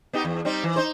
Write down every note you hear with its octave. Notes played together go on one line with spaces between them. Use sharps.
B3 D#4 G4
E2
G3 C4 D#4
E3
D#4 C5